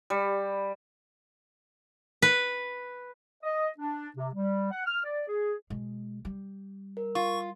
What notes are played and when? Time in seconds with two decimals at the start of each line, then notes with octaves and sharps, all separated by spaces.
0.10 G3
2.22 B4
3.43 D#5
3.79 D4
4.17 C3
4.35 G3
4.71 F#5
4.86 F6
5.04 D5
5.28 G#4
5.70 B2 G#3
6.25 G3
6.97 A#4
7.15 F4 C#6